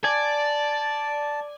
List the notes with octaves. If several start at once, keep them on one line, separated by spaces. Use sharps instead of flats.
D5 G#5 A5